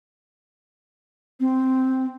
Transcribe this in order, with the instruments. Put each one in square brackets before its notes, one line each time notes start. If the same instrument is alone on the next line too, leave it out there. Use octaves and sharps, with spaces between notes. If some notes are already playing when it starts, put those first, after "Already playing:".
[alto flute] C4